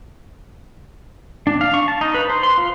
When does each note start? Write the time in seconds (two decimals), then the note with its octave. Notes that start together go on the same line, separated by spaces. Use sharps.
1.47 D4
1.61 F5
1.74 C#6
1.88 A5
2.01 D#4
2.14 B4
2.30 C5
2.43 C6
2.58 F4